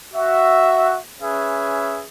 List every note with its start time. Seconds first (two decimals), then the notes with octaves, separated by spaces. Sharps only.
0.12 F#4 E5
1.19 C#4 G#4 B4 E5